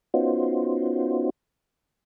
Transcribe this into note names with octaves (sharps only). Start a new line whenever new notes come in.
B3 C#4 D#4 F4 F#4 C5